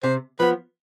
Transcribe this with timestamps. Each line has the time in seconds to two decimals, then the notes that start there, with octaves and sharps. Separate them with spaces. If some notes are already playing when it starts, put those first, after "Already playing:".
0.03 C3 C5
0.39 F3 B3 B4